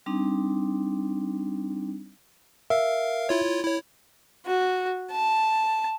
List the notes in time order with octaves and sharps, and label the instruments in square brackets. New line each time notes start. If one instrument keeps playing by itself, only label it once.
[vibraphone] G3 C4 D4 D#4
[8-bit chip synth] A#4 F5 [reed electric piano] E5
[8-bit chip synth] E4 F4 C#5
E4 C#5
[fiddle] F#4
A5